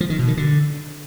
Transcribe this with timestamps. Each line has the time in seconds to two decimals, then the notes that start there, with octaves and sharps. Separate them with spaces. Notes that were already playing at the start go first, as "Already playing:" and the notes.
0.01 F3
0.10 D#3
0.19 B2
0.28 D#3
0.37 D3